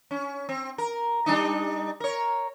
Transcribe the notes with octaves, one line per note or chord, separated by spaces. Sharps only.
C#4
C4
A#4
G3 D4 D#4
A#4 C#5